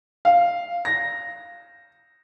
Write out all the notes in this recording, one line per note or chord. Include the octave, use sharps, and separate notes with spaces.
F5
A#6